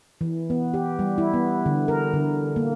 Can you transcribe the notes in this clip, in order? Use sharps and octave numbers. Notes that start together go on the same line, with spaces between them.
E3
B3
G4
G3
E4
B3
D3
A#4
D3
A#3